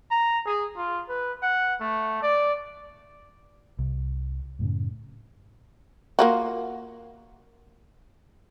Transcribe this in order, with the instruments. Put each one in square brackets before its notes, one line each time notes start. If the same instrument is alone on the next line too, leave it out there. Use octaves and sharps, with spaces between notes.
[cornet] A#5
G#4
F4
B4
F#5
A3
D5
[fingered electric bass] C2
F#2 A2 C#3
[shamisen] A#3 F4 F#4